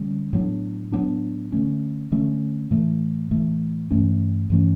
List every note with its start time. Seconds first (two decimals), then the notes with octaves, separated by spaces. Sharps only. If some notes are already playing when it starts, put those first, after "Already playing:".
Already playing: D3 G3 C#4
0.33 A2 F#3 B3 D4
0.92 A2 F#3 B3 D4
1.52 D3 A3 C#4
2.12 D3 A3 C#4
2.71 A2 E3 A3
3.31 A2 E3 A3
3.91 G2 E3 A3 C#4
4.50 G2 E3 A3 C#4